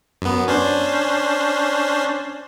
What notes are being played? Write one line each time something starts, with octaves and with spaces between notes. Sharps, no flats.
F#2 B3
C#4 D4 C5